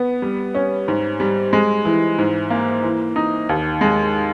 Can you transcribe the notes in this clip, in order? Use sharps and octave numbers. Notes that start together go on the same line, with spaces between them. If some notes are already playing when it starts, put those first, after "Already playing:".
Already playing: B3
G3
C#4
G#2
G3
G#3
E3
G#2
A#3
E3
D#4
D#2
G#3